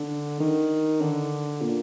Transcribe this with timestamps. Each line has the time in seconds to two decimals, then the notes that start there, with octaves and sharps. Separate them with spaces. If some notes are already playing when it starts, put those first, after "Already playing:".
Already playing: D3
0.40 D#3
1.01 D3
1.62 A#2